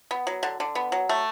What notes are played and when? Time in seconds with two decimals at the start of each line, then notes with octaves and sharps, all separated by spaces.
0.11 B3
0.27 F#3
0.43 D3
0.60 D3
0.75 B3
0.92 F#3
1.09 A3